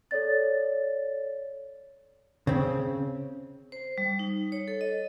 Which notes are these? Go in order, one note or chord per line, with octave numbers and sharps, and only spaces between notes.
A4 C#5 D5 A6
C#3 C4
C5
G3
D#4
C#5
A4
D#5